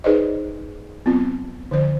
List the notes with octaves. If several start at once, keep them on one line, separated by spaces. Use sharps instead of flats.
D#4 G#4 B4 C5 D5 D#5
F#3 B3 C4 F4
D3 F3 C5